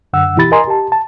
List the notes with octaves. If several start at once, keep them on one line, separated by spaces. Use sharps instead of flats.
F#2 D3 F#5 E6
B2 E3 E4 G4 B5 A6
A#4 D#5 G#5 A#5 C6
G4 A5
A5